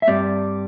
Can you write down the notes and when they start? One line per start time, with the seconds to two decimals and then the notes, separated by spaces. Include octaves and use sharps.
0.02 E5
0.07 G2 G3 C4 D5